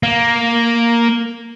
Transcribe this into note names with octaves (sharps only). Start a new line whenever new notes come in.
A#3